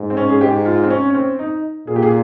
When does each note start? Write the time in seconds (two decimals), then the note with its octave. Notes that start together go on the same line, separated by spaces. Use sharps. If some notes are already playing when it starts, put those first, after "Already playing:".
Already playing: G#2
0.10 C4
0.17 C#4
0.29 G#4
0.41 G#2 G4
0.65 F4
0.83 C4
0.90 C#4
1.10 C#4
1.14 C4
1.39 D#4
1.87 A#2 G#4
1.96 G4
2.03 G#4